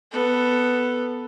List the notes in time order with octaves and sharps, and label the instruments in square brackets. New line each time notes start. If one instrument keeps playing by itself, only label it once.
[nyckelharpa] B3 A4